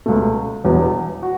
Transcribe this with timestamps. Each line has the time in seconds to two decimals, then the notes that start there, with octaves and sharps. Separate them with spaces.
0.06 C#2 B2 A3
0.64 E1 E2 B2
1.23 F#4